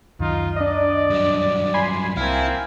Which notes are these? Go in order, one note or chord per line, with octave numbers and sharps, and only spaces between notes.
C#2 F#2 D#3 D#4 F4
D4 D5 D#5
G2 F#3
G#5 B5 C6
C2 A#3 C4 E4 F5 G#5